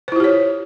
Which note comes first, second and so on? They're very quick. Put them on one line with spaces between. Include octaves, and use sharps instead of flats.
C5 E4 F4 G4 C#5